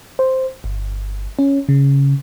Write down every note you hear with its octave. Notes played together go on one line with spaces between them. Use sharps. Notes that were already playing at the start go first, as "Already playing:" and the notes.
C5
G1
C#4
C#3